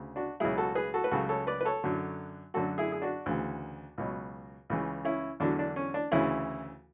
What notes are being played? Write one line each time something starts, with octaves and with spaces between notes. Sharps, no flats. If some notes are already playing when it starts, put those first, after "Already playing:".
Already playing: D2 C#3
D4 F#4
C#2 B2 F#3 E4 G#4
F#4 A4
G#4 B4
F#4 A4
B4
C#2 C#3 F#3 F#4 A4
A4 C#5
B4 D5
B4
A4 C#5
F#2 D3 F#3
F#2 D3 F#3 F#4 A4
E4 G#4
G#4
D4 F#4
D2 C#3 E3
C#2 B2 F#3
C#2 C#3 E3
C#4 E4
E2 D3 F#3 D4
D4
C#4
D4
D2 C#3 E3 C#4 E4